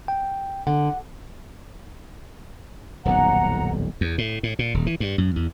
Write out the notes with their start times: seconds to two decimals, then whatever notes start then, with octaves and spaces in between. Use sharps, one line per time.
0.08 G5
0.67 D3 F#5
3.05 D#1 B1 F2 F#5 A#5
4.01 E2
4.18 A2
4.43 A2
4.59 A#2
4.74 D#1
4.86 E3
5.00 G2
5.18 F#2
5.36 E2